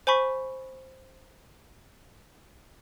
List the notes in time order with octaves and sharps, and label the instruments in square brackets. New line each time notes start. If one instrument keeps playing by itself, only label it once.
[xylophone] C5 G#5 B5 C#6 B6